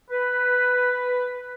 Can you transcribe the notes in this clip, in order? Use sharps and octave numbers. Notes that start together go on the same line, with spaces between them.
B4